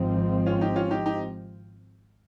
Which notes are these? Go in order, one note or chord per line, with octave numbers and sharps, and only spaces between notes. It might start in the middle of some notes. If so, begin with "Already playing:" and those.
Already playing: G#1 G#2 F3 C4 D#4
C#4 F4
D#4 G4
C#4 F4
D#4 G4
D#4 G4